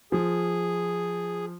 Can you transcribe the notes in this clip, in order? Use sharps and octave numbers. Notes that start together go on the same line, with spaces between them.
F3 G#4